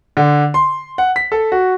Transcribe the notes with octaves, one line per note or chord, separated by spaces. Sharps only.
D3
C6
F#5
B6
A4
F#4